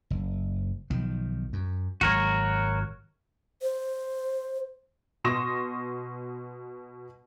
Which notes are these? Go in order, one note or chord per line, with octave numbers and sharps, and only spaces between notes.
F#1
B1 D#3 F3
F#2
G#1 F#3 F#4 A#4 C#5
C5
B2 C6 C#6 D#6 A#6 E7